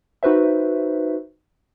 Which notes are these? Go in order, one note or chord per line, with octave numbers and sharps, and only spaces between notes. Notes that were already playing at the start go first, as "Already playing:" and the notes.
D#4 F#4 B4 C5 E5